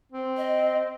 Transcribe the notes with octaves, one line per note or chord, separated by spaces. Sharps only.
C4
D#5